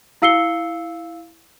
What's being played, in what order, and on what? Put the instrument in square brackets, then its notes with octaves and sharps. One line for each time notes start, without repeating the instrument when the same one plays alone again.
[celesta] E4 F5 E6 C7 C#7 G7